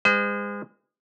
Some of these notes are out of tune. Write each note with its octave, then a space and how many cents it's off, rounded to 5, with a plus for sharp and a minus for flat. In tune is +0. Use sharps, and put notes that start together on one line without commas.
G#3 -30 C5 -40